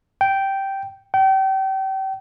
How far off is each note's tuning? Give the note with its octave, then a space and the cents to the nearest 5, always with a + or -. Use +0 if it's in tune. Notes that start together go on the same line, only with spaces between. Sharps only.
G5 -10
G5 -35